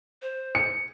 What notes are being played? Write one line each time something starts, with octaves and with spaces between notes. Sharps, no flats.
C5
C#7